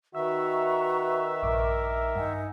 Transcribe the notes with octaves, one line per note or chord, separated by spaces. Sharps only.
D#3 F#4 B4 E5 A#5 C#6 E6
A#1 G2 A#4 D6
G2 D#4 F#5 G#5